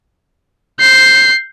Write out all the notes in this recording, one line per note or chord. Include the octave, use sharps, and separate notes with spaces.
G6 C7